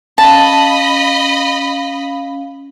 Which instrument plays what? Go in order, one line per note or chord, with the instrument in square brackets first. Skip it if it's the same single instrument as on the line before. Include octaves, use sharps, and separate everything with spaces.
[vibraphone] C#4 F5 [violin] D#5 B5 [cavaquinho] A5